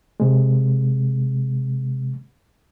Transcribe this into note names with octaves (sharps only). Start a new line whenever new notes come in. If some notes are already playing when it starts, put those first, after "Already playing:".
C3 G#3